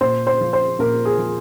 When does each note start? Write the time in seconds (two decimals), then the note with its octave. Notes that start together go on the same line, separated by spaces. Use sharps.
0.01 A#2 C5
0.27 C5
0.41 F3
0.53 C5
0.79 A#2 A#4
1.05 G#4
1.18 F3